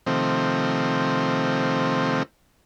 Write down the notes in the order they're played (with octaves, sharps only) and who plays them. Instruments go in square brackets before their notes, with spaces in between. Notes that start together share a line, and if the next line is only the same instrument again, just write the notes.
[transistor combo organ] C3 D#3 F3 A3 C4